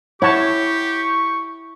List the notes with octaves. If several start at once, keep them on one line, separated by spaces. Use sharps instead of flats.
E4 G4 C#5 F#5 A5 C#6